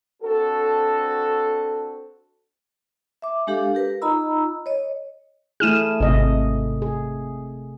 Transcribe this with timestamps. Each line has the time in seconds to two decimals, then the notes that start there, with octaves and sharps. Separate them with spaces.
0.22 C4 D4 F#4 A4
3.22 E5 D6
3.47 G#3 D4 G4 A4 F5
3.75 G4 A#4 B4
4.02 D#4 F4 D#5 A#5 B5 E6
4.66 C#5 D#5
5.60 A3 E4 G#4 F6 D#7 E7
6.00 G#1 C3 A3 D#5
6.82 G#4